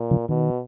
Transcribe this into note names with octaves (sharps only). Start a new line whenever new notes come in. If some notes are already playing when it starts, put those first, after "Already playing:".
Already playing: A#2
C#3 F3
B2 D#3